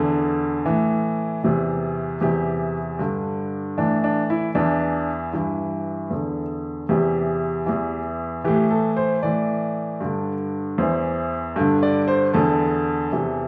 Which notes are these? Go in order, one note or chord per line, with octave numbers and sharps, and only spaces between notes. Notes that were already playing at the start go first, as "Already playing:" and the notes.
Already playing: E2 D3
A2 E3
E2 C3 E3
E2 C3 E3 G4
G2 D3
A2 E3 D4
D4
E4
E2 E3 D4
G2 E3 E4
E2 D3
E2 C3 E3 G4
E2 E3
A2 E3 G4
A4
C5
A2 E3 D5
G2 D3
E2 E3 C5
G2 A4
D3
D5
C5
E2 D3 A4
E2 C3 E3